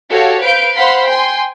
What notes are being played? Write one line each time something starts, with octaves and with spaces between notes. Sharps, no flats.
F#4 G4 A4 C#5 F5
B4 C5 F5 G6 D7
C5 F5 F#5 B5 C6
G5 G#5 C6